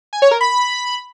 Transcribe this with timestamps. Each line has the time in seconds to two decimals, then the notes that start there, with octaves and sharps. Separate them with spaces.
0.13 G#5
0.22 C#5
0.31 A#4
0.41 B5